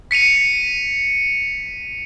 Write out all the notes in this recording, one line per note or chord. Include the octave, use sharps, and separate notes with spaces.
B6 C#7 D#7 F7